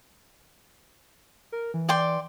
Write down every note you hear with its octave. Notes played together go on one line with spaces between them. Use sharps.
A#4
E3
D5 G5 C6